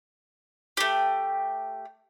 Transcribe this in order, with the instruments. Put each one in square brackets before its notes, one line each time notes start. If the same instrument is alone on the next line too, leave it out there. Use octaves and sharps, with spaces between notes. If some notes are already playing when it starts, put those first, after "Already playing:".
[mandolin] A3 G4